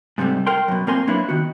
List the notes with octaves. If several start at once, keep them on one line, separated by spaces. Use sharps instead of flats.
G#2 C3 F#3 G3 A3
A#4 G5 C6
F#2 B2
A#2 A#3 C4 A#4 G#5 C6
F#3 A#3 D4 E4 B4 C#5
D#3 B3 F#4